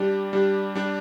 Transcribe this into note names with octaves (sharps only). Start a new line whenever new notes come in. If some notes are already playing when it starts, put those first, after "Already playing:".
Already playing: G3 D4 G4
G3 D4 G4
G3 D4 G4